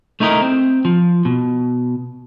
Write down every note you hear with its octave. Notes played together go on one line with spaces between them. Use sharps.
A3 D#4 E4 A#4 D#5
C4
F3
B2